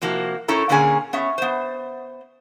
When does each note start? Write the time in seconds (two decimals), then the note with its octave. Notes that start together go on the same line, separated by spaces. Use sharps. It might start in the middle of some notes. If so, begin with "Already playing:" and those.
0.02 C3 F3 A#3 E4 F#4
0.48 A2 A3 C#4 E4 A4 A#5
0.69 A#2 D3 A#3 C#4 G#4 G#5
1.13 B3 C#4 E5
1.38 B3 C5